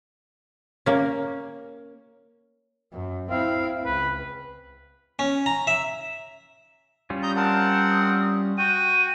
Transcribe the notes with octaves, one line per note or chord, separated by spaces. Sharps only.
A#3 C#4
F#2
C4 E4 F5
C#2 B4
C#4
A#5
E5
G3 C#4 F4
A#5 D#6 G6
C4 A#4 F#5 A5
D#6
F#4 G5 D#7